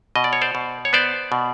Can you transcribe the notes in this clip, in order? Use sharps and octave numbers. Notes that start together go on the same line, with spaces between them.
B2 D#5
D5
C#5
C5 D5
B2
C#5
B3 C5 D5
B2